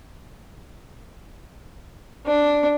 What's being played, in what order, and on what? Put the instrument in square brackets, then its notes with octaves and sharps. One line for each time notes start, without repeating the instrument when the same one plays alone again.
[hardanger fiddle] D4